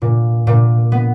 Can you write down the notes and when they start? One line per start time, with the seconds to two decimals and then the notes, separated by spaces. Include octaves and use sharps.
0.02 A#2
0.47 A#2
0.92 B3